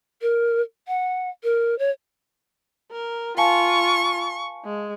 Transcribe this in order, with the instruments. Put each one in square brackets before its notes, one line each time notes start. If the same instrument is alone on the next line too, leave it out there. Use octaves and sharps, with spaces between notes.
[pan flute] A#4
F#5
A#4
C#5
[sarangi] A#4
[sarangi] F4 [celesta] F5 G#5 A5 [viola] C#6
[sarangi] G#3